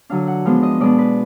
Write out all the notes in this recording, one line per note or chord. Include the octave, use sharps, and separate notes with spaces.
D3 F#3 D4 F5
F#5
F3 G#3 B3 D4 F5
D#5
B2 G#3 B3 D4 D5
B4